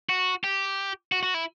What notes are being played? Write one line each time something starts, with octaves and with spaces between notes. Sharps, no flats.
F#4
G4
F#4
F#4
E4